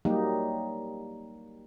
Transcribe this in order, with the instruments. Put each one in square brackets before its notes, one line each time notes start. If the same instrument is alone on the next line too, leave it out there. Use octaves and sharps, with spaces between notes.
[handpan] F#3 G3 A#3 D#4 G4